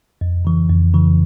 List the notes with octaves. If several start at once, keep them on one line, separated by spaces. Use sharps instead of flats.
F2
C#3 E3
F2
C#3 E3